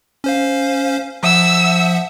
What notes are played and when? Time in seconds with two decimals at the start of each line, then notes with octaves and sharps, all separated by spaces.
0.24 C#4 C5 F5
1.23 F3 E5 F#5 E6